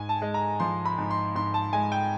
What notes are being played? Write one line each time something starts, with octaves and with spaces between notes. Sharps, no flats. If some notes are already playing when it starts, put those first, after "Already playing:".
Already playing: G#2 G#5
A5
G#3
A#5
F3 C6
B5
G#2
C6
G#2 C6
A5
G#3 G#5
G5